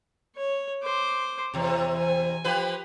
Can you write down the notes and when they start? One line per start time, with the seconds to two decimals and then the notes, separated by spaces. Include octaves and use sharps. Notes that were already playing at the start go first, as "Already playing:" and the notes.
0.36 C#5
0.83 C5 D6
1.54 E2 C3 C#5
1.96 G#5
2.44 F3 G4 B4